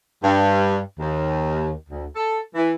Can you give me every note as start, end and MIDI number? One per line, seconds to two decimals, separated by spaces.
0.23 0.78 43
0.99 1.70 39
1.89 2.05 38
2.15 2.39 69
2.54 2.72 52